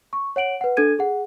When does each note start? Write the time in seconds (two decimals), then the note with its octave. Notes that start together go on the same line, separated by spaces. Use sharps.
0.13 C#6
0.36 C#5 F#5 D7 F#7
0.61 B4 F#5
0.77 D4 A4 G#6 D#7
0.99 G#4 F#5